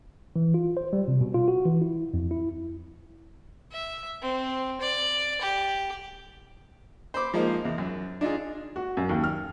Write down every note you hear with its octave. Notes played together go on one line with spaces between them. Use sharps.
E3
F4
C5
G3
C3
B2
F4
F#4
E3
E4
F2
E4
E5
C4
D5
G4
C5 B5 D6
F3 G#3 A#3 D#4 C5
E2
F#2
D4 D#4 F4 G#4
F#4
F#2
D#2
F6